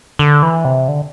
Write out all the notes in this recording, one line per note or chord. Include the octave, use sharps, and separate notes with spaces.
D3
E3
C3
D3